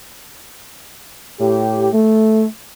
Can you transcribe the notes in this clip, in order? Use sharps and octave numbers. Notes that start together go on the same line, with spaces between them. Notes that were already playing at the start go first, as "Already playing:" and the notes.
A2 G4
A3